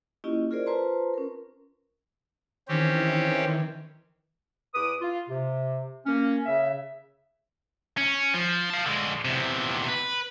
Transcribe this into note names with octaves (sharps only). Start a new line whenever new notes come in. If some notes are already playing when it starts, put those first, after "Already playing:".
A#3 C#4 E4 F4 G4 D#5
F4 G#4 A#4 C5 D5
F4 B4 C5 A5 A#5 C6
C#4 A#4
D#3 E3 C4 C#4 G4
E2 B4 D6 D#6
F4
C3
A#3 C#4
C#3 E5
C#4
F3
F5 A5
D3 G#3
E2 C3
B4